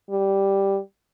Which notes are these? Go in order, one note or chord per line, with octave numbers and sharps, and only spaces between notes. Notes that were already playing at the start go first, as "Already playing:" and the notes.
G3